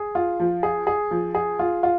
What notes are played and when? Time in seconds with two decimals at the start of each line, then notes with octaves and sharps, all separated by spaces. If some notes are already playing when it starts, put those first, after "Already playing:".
Already playing: G#4
0.15 F4
0.40 F3
0.63 G#4
0.87 G#4
1.11 F3
1.35 G#4
1.59 F4
1.83 F4